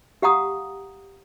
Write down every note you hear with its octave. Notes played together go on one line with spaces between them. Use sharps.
G4 F5 F#5 A#5 D#6